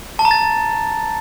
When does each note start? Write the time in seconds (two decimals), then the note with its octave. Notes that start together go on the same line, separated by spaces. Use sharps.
0.19 A5
0.25 A#5
0.31 A6